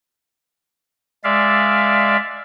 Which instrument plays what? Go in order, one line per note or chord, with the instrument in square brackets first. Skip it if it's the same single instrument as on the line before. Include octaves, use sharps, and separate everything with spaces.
[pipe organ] G#3 D5 E5 F5